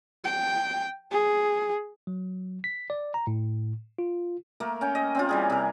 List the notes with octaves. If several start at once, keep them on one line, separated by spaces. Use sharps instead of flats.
G5
G#4
F#3
B6
D5
A#5
A2
F4
A3 A#3 A#4
C#4 G5
D#5
C4 C#4 F4
E3 G3 G#4
C3 A#4